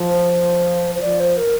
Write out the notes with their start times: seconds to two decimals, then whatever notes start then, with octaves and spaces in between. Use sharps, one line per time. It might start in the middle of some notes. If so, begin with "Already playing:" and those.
Already playing: F3
0.08 C5
0.95 C5
1.01 F3 D5
1.20 C5
1.37 A#4